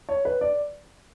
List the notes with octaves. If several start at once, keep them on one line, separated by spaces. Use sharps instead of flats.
C#5
B4
D5